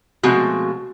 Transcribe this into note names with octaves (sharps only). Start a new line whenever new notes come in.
B2 F3 G#3 A3 C4 F#4